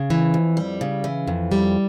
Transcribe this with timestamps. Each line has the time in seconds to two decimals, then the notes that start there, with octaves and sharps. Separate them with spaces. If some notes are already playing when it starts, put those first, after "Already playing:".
Already playing: C#3
0.10 E3
0.34 F2
0.57 G3
0.81 C#3
1.04 E3
1.27 F2
1.52 G3